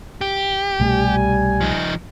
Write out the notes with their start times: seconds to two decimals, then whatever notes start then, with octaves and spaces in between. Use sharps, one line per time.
0.21 G4
0.80 C2 B2 G3 A3 G#5
1.61 F3 D#4